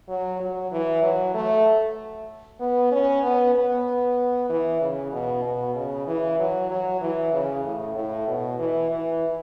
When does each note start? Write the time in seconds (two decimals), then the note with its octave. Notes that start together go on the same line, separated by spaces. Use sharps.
0.08 F#3
0.40 F#3
0.71 E3
1.03 F#3
1.34 A3
2.60 B3
2.92 C#4
3.23 B3
3.55 B3
4.49 E3
4.81 C#3
5.12 B2
5.44 B2
5.75 C#3
6.07 E3
6.39 F#3
6.70 F#3
7.01 E3
7.33 C#3
7.64 A2
7.95 A2
8.27 B2
8.59 E3
8.91 E3